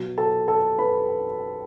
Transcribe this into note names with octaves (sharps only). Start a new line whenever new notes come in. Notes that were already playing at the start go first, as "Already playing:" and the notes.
Already playing: B2 F#3
A4 A5
A4 A5
B4 B5